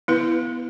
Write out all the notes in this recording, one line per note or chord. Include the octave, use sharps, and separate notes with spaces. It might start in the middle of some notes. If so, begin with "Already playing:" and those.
B3 E4 B4